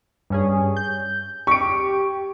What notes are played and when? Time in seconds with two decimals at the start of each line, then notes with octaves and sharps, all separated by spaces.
0.30 G2 C#4 G#4
0.77 G6
1.47 G4 C#6 D7